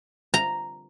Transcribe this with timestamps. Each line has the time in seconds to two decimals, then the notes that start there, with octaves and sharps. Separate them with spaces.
0.34 A#5